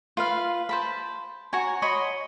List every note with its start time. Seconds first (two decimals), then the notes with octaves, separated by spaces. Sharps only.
0.17 F4 B4 F5
0.69 C5 A5 B5
1.53 F#4 C#5 G#5 A#5
1.82 C#5 D#5 B5 C6